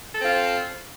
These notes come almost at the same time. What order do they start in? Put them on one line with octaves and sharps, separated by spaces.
A4 C4 F4